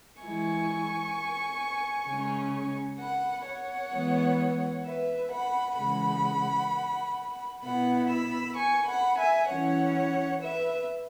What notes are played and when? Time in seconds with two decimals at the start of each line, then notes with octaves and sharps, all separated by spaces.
0.21 E3 G#3 E4 G#5 C#6
2.07 C#3 G#3 C#4
2.99 F#5 B5
3.46 C#5 F#5
3.92 E3 G#3 B3
4.85 B4 E5
5.32 F#5 B5
5.78 C#3 E3 G#3 F#5 B5
7.63 B2 B3 E4 F#5 B5
8.10 B5 E6
8.56 G#5 C#6
8.87 F#5 B5
9.18 E5 G#5
9.49 E3 C#4 E4 C#5 F#5
10.42 B4 E5